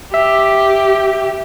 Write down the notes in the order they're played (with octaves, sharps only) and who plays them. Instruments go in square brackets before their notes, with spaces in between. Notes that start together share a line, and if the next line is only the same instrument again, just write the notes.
[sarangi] G4 [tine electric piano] E5